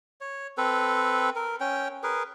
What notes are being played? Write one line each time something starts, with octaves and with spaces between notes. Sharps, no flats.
C#5
C4 A4 B4
A#4
C#4 G5
G#4 A#4 B4